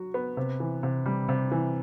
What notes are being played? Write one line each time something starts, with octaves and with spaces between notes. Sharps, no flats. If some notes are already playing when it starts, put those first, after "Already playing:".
Already playing: F#3 F#4
B3
C3
E3
C3
G3
C3
E3